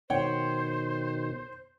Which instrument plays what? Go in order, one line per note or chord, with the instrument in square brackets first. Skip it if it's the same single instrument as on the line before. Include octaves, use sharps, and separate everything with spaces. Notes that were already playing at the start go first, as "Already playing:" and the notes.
[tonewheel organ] B2 D#3 [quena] C5 [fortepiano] C#5 F#5 G5